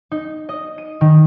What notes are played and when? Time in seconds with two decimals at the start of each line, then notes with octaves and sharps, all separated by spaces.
0.11 D#4
0.49 D#5
0.78 D#7
1.01 D#3